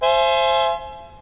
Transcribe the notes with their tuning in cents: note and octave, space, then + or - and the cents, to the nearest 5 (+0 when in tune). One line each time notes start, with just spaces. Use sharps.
C5 +15 E5 +35 G#5 +30